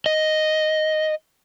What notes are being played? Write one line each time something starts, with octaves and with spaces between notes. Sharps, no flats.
D#5